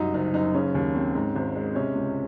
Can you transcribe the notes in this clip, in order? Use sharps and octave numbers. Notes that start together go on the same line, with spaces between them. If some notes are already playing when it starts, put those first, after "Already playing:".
Already playing: C2 F#2 D#4
F#1 D#4
F#1 D#4
C#3 C#4
D#2
C4
G#2
G#1
G#3
C3 C#4
C#2